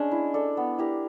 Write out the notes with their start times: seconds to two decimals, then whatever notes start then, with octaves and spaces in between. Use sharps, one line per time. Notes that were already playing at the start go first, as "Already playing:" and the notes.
Already playing: G#3 C#4 D4
0.11 E4
0.34 A4 D5
0.57 B3
0.78 E4 G4 A#4